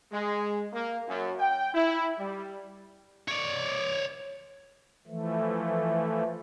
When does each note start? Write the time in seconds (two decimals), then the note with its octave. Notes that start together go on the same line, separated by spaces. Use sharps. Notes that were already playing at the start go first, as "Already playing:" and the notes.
0.12 G#3
0.73 A#3
1.08 F#2
1.40 G5
1.74 E4
2.19 G3
3.28 C#5 D5
5.08 E3 F3 A3